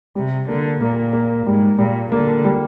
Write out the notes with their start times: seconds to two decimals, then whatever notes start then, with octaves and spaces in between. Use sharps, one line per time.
0.15 C3 G3
0.48 D3 A#3
0.81 A#2 A#3
1.13 A#3
1.46 G#2 G3
1.78 A#2 G3
2.12 D3 A#3
2.44 G3